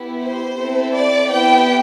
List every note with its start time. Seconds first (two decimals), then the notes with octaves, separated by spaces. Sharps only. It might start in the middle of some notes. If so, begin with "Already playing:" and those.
Already playing: B3 E4 G4
0.22 C5
0.58 C4 E4 A4
0.94 D5
1.31 B3 E4 G4 G5